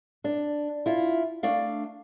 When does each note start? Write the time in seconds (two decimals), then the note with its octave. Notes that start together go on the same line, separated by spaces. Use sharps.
0.24 D4
0.86 E4 F4
1.43 A3 D4 F5